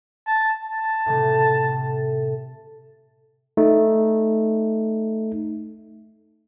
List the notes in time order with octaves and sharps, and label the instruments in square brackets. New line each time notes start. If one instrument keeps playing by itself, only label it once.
[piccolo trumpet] A5
A5
[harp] A2 C3 A3
[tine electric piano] A3 D#4